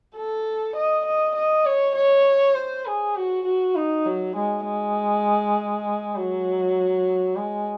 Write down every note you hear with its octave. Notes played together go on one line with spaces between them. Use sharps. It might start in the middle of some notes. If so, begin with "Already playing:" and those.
A4
D#5
D#5
D#5
C#5
C#5
C5
G#4
F#4
F#4
D#4
F#3
G#3
G#3
F#3
G#3